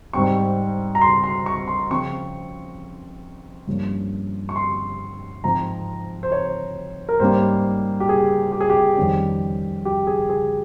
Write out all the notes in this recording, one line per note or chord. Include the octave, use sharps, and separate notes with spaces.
G#2 G3 C4 C#6
A#5
C6
C6
C#6
C6
C#3 F3 C4 C#6
G2 F3 A#3 C#4
C#6
C6
G#2 F3 C4 A#5
C5
C#5
A#4
G#2 G3 A#3 C#4 C5
G4
G#4
G4
G#4
G4
F2 D#3 G3 C#4
G4
G#4
G#4